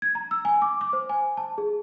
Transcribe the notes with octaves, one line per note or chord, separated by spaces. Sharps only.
G#6
A#5
E6
G#5
D6
D6
C5
G#5
A5
G#4